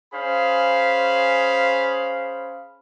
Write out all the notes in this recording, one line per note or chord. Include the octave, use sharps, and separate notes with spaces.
C#4 G#4 C5 F5 B5